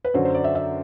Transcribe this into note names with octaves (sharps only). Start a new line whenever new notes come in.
B4
F#2 D3 F#3 C5
C5
D5
E5
E5